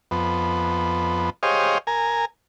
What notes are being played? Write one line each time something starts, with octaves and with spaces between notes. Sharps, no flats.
F2 B3
G4 G#4 C5 C#5 D#5 F5
A#4 G#5